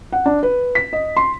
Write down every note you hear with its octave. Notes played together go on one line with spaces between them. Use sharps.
F#5
D4
B4
B6
D#5
C6